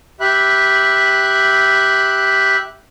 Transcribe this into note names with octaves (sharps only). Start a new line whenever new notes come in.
G4 E5 B5 F#6